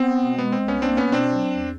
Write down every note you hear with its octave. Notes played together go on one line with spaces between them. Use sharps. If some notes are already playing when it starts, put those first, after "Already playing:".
Already playing: B3 C4
B2
G#3 B3
C4
C2
B3 C#4
A#3 C4 D4
B3 C#4
B2
C4 D4
F#3
E2